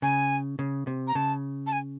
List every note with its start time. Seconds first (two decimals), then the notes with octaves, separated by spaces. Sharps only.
0.02 C#3 G#5
0.59 C#3
0.87 C3
1.08 A#5
1.15 C#3 A5
1.67 A5
1.72 G#5